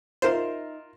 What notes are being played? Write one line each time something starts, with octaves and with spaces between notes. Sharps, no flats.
D#4 F4 A#4 C5 E5 E7